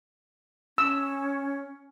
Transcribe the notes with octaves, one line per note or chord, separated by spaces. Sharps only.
C#4 E6